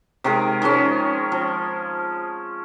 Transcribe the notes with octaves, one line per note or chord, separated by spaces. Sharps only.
C3 D#3 G#3 A#4
D#3 F3 G#3 C#4
F3